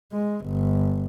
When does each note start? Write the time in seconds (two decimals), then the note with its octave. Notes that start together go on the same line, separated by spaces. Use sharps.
0.12 G#3
0.46 G1